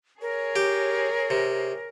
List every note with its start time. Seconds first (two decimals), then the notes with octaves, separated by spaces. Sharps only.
0.22 G#4 A#4 C#5
0.56 G4
1.30 C3